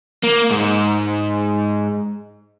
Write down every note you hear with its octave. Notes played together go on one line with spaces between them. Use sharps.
A#3
G#2